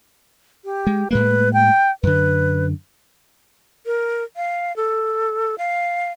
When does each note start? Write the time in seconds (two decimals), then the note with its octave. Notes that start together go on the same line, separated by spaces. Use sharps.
0.65 G4
0.87 G#3
1.11 A2 G#3 A#3 B4
1.53 G5
2.03 F#2 D3 B4
3.86 A#4
4.36 F5
4.76 A4
5.58 F5